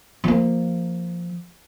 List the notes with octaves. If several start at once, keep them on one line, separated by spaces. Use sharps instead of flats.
F3 A#3